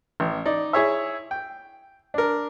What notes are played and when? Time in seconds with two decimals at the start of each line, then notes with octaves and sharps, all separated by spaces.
0.20 A1
0.45 D#4 D5
0.73 E4 G#4 C#5 E5
1.31 G5
2.14 D4 A#4